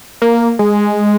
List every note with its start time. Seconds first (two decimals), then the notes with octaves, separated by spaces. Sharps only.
0.22 A#3
0.59 G#3